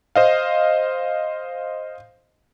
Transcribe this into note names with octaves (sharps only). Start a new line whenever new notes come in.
C5 D#5 F5